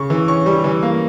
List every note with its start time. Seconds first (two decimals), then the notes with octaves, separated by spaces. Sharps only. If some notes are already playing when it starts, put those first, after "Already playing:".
Already playing: C#3 C#6
0.10 E3
0.28 C#4 C#6
0.46 G3
0.64 E3
0.82 A#3